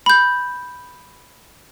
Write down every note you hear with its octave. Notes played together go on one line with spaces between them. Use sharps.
B5 G6